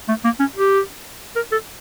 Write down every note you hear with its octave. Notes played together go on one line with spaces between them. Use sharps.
A3
A#3
C#4
G4
A#4
A4